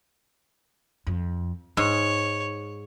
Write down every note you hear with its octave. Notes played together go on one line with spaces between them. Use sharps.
F2
G#2 D#4 C#5